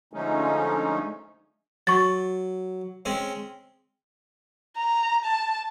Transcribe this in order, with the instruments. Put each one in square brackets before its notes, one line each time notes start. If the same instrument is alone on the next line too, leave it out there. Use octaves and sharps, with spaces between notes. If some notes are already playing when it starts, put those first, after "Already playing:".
[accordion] D3 F3 G#3 A3 C#4 D#4
[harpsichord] F#3 [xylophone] C#6 A6
[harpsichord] G#3 C4 C#4
[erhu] A#5
A5